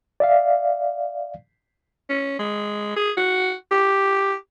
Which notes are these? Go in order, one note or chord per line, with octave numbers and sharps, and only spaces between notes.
D5 E5 F5
C#4
G#3
G#4
F#4
G4